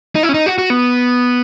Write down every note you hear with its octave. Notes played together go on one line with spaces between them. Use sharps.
D#4
E4
C#4
D#4
F#4
F#4
B3